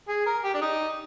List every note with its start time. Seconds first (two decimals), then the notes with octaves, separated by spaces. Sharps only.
0.08 G#4
0.26 A#4
0.44 G4
0.54 D4
0.61 D#4